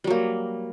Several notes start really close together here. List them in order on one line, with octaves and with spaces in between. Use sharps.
G3 F#3 A#3